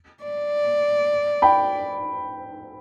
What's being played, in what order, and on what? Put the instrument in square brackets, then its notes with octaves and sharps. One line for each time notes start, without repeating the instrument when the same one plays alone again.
[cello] D5
[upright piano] G5 B5